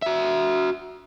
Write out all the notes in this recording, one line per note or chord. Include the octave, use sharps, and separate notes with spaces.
F#4 E5